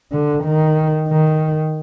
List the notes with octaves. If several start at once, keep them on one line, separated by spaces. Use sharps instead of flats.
D3
D#3
D#3